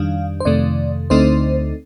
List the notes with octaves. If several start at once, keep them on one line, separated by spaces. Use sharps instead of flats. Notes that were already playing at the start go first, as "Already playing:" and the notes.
Already playing: F2 D#3 G3 D4 F5
C5
F2 C3 D#3 A3 D5
D2 D3 A3 C4 D#4 C5